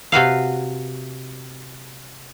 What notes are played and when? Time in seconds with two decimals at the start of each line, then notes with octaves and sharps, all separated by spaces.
0.12 C3 F#4 B4 F5